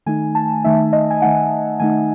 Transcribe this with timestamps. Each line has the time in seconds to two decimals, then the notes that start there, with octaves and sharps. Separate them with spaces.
0.06 D#3 A3 D#4 G#5
0.35 A5
0.64 D#3 A3 D#4 E5
0.93 D#5
1.10 G#5
1.22 D#3 A3 D#4 F#5
1.80 D#3 A3 D#4 G#5